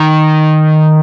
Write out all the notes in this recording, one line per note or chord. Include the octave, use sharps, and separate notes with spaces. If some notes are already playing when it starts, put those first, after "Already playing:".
Already playing: D#3